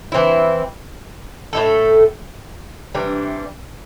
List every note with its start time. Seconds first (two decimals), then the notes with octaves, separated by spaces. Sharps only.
0.12 E3 G3 C4 E4
1.53 A2 A3 E4 A4
2.94 C3 E3 G3 D4